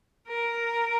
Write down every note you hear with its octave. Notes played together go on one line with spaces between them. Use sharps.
A#4